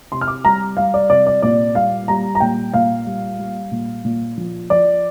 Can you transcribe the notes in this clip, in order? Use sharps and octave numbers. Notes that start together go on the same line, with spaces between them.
C3 C6
F6
D6
G3 A#5
G3 F5
D5
C3 D5
D5
A#2 D5
G3 F5
G3 A#5
A#5
A#2 G5
A#2 F5
G3
G3
A#2
A#2
F3
F3 D5